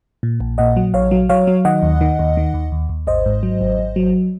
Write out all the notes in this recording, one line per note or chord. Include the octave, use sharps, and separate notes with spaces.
A#2
A#1
A#2 D#5 F#5
F#3
A#1 C#5 F5
F#3
F#3 C#5 F5
F#3
D#3 D#5 F#5
D#2
D#3
D#2
D#3
D#2
D#2
D#2
G#1 C5 D#5
G#2
F#3
G#1
G#1
F#3